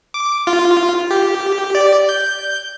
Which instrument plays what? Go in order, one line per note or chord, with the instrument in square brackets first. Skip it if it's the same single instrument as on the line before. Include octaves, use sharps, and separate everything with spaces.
[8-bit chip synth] D6
F4
G4
D5
G6